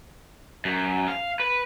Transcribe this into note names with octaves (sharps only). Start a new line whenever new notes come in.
F#2
F5
B4